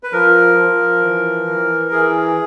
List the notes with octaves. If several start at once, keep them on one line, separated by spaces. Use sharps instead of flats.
B4
F3 A#4
F3
E3
E3
E3 G#4